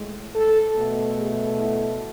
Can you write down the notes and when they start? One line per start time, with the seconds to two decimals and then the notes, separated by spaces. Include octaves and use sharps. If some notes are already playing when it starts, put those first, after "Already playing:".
Already playing: A2 G#3
0.34 A4
0.74 B2 A3
1.16 G#4
1.57 E4